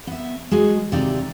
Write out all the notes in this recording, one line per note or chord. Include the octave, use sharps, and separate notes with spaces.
B3 E5
G#3 F#4 G#4 D#5
D#2 C3 D#4 D5 E5 A#5